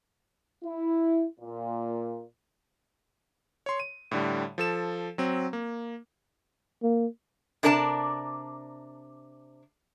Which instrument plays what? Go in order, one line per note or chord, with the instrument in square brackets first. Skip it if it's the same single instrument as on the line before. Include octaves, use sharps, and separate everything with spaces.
[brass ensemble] E4
A#2
[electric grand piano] C#5 C6
D#7
A2 D3 G3
F3 A4 E7
F#3 C4
A#3
[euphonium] A#3
[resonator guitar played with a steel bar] C3 D4 A#4 D5 A5